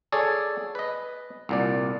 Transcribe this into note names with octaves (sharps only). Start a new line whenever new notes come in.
G#4 A4 C#5 D5
B4 D#5
C2 A#2 D5